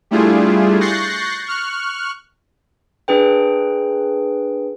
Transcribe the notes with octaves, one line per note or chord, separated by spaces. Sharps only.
G3 A3 D4 E4 F4 G#4
C#6 F#6 G6 A6 A#6 C7
C#6 F6 F#6
D4 G#4 B4 G5